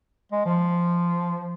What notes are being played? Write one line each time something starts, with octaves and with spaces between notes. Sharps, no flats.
G#3
F3